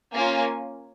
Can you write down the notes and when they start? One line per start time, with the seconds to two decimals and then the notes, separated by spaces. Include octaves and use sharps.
0.14 A#3 C#4 F4 G#5